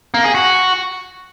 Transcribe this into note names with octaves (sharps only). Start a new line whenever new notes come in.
A#3
G#4
F#4